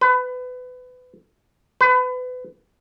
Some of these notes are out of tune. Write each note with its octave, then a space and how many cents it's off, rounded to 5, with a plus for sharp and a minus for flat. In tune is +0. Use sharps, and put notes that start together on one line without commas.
B4 +25
B4 +30